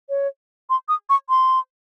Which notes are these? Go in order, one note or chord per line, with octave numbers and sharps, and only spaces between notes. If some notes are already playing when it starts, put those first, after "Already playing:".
C#5
C6
D#6
C#6
C6